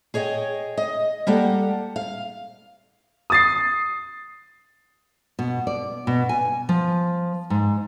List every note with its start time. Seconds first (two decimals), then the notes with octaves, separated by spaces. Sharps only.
0.14 G#4 C#5 D#5 F#5 G5
0.77 D#5
1.27 G3 A#3 G4 A4 F#5
1.96 F5
3.30 D#6 A6 C7
5.39 B2
5.67 D5
6.07 B2
6.29 G#5
6.69 F3
7.50 G#2